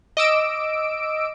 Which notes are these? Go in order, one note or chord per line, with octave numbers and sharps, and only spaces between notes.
D#5 D6 E6 D7